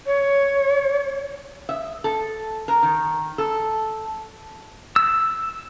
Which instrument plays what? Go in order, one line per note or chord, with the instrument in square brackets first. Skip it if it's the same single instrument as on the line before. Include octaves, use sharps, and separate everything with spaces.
[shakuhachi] C#5
[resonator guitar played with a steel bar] E5
A4
A#4
D#3
A4
[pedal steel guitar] E6